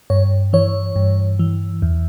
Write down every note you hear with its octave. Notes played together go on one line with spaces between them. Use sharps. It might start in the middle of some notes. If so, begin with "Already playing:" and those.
G2 C#5
E3 C#5
G2
E3
E2